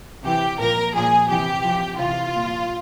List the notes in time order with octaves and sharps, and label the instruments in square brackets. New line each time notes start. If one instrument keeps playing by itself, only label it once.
[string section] C3 E3 G4
A#2 F3 A#4
A#2 F3 G#4
C3 E3 G4
C3 F3
C3 E3 F4
A#2 F3